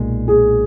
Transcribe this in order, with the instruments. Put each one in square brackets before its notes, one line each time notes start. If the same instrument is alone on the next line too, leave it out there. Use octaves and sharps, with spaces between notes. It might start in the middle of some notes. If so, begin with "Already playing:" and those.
Already playing: [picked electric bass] B1 A#2 G#3
[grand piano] G#4